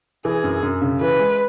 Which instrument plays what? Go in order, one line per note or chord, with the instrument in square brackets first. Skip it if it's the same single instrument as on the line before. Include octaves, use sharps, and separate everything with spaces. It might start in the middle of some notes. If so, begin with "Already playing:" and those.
[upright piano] E3 [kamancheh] G#4
[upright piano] F#2
F#2
C#3
[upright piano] E3 [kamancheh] B4
[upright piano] G#3